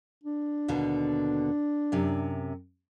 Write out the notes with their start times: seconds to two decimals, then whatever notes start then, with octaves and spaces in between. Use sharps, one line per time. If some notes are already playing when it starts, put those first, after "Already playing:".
0.24 D4
0.68 D#2 B2 D3
1.92 F#2 C3